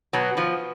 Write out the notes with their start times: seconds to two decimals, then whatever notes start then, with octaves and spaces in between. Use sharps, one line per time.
0.13 B2 F#3
0.37 B2 F3